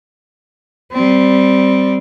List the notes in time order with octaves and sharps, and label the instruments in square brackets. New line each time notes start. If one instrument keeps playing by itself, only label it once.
[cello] G3 C4